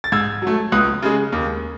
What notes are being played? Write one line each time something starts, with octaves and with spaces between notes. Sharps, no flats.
A6
G#2 E6 G#6
F#3 A3
C#2 D#6 F#6
C#3 G#3
D#2